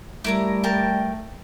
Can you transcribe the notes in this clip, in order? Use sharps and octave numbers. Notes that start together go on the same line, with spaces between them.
G3 A3 E4 A#4 A#5
A#4 G5 A5